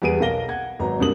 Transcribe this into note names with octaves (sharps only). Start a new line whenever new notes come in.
E2 G3 B3 G#4 D7 D#7
B1 A#4 F5 A#6 G7
F#5 G#6
G#1 F#3 G#3 B3 A#5
C2 G2 A#3 D#6 F#7